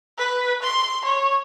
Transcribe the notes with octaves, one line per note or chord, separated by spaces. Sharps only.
B4
C6
C#5